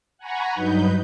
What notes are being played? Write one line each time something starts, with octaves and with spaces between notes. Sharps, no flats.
F#5 G#5 A#5 B5 C#6
G2 F#3 D#4 B4 G6